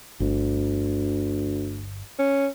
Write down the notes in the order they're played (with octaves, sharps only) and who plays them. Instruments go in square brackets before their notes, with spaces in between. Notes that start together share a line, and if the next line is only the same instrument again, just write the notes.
[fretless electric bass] G1 [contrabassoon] D2
[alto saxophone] C#4